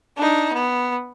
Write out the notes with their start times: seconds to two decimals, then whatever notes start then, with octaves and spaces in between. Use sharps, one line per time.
0.17 D4 D#4
0.54 B3